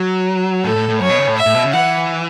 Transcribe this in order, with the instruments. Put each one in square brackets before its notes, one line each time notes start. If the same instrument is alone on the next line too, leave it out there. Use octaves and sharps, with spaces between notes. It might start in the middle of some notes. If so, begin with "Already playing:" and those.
Already playing: [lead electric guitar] F#3
[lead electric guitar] A2 [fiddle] A4
[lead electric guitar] A2
A2
[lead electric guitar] F#2 [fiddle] C#5
[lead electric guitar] B2
C#3
A2
[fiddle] E5
[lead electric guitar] A2
B2
C#3
[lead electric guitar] E3 [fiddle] F#5